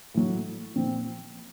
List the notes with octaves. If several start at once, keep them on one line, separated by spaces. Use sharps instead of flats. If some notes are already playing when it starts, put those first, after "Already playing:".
A2 F#3
A#2 F3 C4